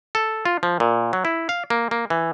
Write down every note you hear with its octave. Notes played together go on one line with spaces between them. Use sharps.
A4
F4
F3
A#2
F#3
E4
F5
A#3
A#3
E3